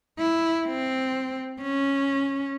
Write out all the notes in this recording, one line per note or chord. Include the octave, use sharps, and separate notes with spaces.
E4
C4
C#4